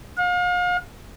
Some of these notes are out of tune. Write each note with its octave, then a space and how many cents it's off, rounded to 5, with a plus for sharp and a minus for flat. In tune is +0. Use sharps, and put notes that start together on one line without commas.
F5 +40